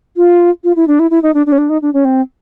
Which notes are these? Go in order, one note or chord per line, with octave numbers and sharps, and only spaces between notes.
F4
F4
E4
D4
E4
E4
D#4
D4
D4
C#4
D4
D#4
D4
C#4
C4